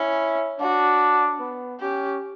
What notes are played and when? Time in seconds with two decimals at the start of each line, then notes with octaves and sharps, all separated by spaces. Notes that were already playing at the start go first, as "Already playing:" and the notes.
Already playing: C#4 E4
0.60 D4 F#4
1.40 B3
1.80 C#4 G4